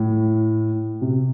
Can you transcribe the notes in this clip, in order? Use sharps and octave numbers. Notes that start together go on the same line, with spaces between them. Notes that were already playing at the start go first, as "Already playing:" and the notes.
Already playing: A2
C3